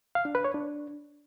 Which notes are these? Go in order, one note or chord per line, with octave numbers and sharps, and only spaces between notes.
F5
D4
B4
C#5
D4